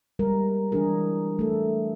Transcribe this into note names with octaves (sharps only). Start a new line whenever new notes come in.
G3 G#3 A#4
E3 G#3 D4 G#4 A#4
A3 A4